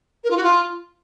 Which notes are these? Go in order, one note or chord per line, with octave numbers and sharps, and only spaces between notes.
A#4
F4
F#4
F4